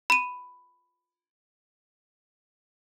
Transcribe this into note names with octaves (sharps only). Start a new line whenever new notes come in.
B5 D#7